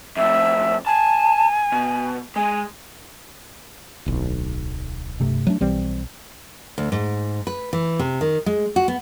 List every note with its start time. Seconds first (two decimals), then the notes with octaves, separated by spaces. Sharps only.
0.17 F2 A2 E5
0.87 G#5 A5
1.72 B2
2.36 G#3 G#5
4.06 D1 B1
5.20 G2 C3 A3
5.47 F#3 A3 D4
5.61 B1 E3 G3 C4
6.78 D2
6.92 G#2
7.47 B4
7.73 E3
7.99 C3
8.21 D#3
8.46 G#3
8.76 F#4
8.88 B3